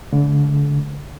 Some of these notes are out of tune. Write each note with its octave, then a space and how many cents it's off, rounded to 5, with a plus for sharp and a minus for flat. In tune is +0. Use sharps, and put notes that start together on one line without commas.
D3 -35 A3 -45